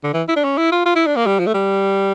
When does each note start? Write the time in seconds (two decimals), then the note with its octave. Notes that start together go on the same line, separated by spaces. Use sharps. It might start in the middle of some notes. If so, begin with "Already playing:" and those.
0.04 D3
0.14 E3
0.28 E4
0.36 D4
0.44 C#4
0.57 E4
0.72 F4
0.85 F4
0.96 E4
1.06 D4
1.16 A#3
1.26 G3
1.39 F3
1.47 A3
1.54 G3